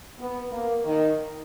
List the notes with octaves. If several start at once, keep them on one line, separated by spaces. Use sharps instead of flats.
B3
A#3
D#3